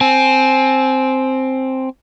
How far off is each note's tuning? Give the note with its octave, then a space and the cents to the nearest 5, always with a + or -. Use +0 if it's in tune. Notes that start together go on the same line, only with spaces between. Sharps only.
C4 +5 G#5 +30